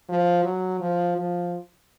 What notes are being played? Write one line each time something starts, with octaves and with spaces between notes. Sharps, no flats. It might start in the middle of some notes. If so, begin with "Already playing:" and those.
F3
F#3
F3
F3